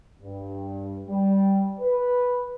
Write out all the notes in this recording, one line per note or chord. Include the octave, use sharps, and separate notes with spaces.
G2
G3
B4